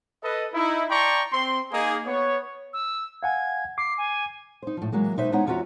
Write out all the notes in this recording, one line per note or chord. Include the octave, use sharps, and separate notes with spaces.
A4 B4 D#5
D#4 E4
D5 G5 A5 A#5 C6 C#6
C4 C6
A#3 D#4 G#4
B3 C#5
E6
F5 F#5 G#5 G#6
D6 C7
G#5
D#4 C5
A2 F3
E3 F#3 G#3 A#3
B2 D#4 B4 C5 E5
G#3 B3 D#4 E4 C#5 F#5
E2 C#4 F4 F#4 E5 A#5